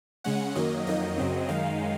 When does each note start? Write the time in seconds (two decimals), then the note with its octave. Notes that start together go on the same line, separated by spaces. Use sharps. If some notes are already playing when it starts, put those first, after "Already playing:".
0.24 C#3 G#3 C#4 F#5
0.55 F#2 D#3 F#3 A#3 D#5
0.87 F2 D#3 F#3 A#3 D#4 D#5
1.18 F#2 C#3 F#3 C4
1.48 F#2 D#3 G#3 D#4 F5